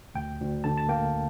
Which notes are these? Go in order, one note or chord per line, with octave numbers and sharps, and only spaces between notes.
D2 G5
D2
D3 A5
A5
A#3 G5